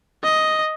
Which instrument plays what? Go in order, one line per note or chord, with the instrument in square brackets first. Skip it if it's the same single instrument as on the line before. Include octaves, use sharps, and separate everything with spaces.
[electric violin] D#5